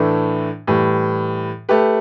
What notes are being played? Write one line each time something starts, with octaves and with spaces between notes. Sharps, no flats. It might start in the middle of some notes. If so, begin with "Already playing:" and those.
Already playing: A2 E3 A3 D4
A2 E3 G3
A3 G4 B4